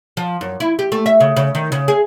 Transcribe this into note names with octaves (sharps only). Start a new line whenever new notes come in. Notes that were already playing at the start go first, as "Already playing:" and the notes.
F3
F#2
E4
G4
A3
E5
C#3
C#3
D#3
C#3
G#4